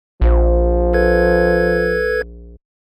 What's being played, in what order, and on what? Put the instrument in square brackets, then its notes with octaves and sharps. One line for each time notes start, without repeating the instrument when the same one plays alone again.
[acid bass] A#1 [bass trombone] F3
[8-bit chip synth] A4 B4 G#6